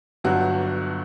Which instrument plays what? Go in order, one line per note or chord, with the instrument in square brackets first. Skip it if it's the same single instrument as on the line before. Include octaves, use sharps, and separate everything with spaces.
[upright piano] G1 G2 D3 F#3 F#4